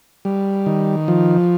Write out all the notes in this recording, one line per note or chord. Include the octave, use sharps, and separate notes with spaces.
G3
D#3
F3